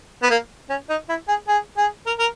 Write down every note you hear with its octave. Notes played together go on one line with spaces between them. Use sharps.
B3
A#3
C#4
D#4
E4
G#4
G#4
G#4
A#4
A#4